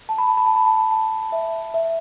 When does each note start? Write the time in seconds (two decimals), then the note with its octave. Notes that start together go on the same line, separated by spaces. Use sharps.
0.09 A5
0.18 B5
0.28 A5
0.37 B5
0.46 A5
0.56 B5
0.66 A5
0.91 A5
1.32 E5
1.74 E5